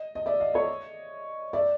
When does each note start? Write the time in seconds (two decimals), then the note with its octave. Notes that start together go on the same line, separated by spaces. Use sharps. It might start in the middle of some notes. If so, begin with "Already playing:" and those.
Already playing: D#5
0.15 D#5
0.26 D5 E5
0.40 D#5 F5
0.54 C#5 D#5
1.53 D5 E5